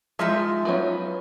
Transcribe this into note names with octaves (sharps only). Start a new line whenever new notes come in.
F3 G#3 D#4 F4 E5
F#3 B3 C#4